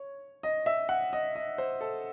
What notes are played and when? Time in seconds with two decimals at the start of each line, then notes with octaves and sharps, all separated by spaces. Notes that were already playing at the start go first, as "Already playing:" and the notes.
Already playing: C#5
0.43 D#5
0.66 E5
0.89 F#5
1.13 D#5
1.35 D#5
1.58 C5
1.81 A4